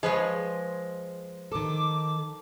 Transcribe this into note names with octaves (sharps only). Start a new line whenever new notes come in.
F3 G#3 B4 C#5
D#3 A4 D6